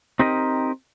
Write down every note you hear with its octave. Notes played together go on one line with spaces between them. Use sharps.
C4 D#4 G4 A#4 D#5